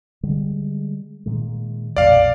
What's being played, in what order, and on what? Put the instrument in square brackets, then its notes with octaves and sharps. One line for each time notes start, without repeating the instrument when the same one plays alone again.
[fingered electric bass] D3 G3 G#3
A#2 D#3 G#3
[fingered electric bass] B1 F2 A#2 [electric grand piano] D5 F5